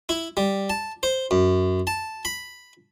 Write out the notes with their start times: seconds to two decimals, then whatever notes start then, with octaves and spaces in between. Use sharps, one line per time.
0.09 E4
0.37 G3
0.70 A5
1.03 C5
1.31 F#2
1.87 A5
2.25 B5